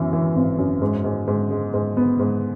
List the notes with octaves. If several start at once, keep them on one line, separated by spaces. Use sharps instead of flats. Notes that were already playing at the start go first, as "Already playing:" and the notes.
Already playing: F#2 E3
E3
G#1
F#2
G#2
G#2
G#2
G#3
G#2
B3
G#2